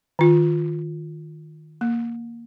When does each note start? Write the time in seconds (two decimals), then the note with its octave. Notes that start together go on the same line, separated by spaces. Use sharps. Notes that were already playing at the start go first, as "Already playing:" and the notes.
0.19 D#3 F4
1.81 A#3